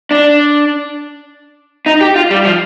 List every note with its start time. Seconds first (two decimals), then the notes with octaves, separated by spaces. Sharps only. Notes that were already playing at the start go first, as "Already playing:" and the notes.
0.11 D4
1.86 D#4
2.01 G4
2.16 F4
2.31 G3
2.45 F3